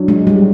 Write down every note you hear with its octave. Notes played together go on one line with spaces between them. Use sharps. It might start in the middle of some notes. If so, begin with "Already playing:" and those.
Already playing: F#3 D4
G#3
G3 G4